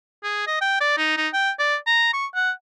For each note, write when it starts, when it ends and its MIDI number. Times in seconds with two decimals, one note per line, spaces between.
0.24 0.44 68
0.47 0.60 75
0.61 0.78 79
0.80 0.97 74
0.98 1.16 63
1.17 1.28 63
1.34 1.51 79
1.59 1.76 74
1.87 2.09 82
2.13 2.26 85
2.35 2.51 78